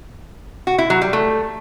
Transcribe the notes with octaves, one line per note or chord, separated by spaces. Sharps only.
F#4
E4
F#3
G3
A3